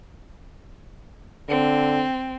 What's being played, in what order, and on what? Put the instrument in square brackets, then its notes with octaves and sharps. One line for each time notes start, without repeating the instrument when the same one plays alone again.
[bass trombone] D3 [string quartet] C4